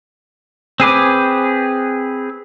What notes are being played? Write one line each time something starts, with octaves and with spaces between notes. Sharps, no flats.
C4 G#4 B4 D6